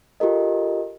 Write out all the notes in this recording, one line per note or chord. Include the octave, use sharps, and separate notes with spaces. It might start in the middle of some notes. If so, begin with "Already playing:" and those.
F4 G4 A4 A#4 D#5